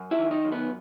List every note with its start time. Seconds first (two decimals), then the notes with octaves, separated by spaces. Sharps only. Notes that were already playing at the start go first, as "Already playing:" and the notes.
Already playing: F#2
0.11 E4 E5
0.19 D#3
0.31 D#4 D#5
0.45 F#2
0.52 B3 B4